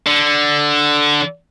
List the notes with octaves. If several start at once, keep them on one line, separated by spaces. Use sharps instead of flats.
D3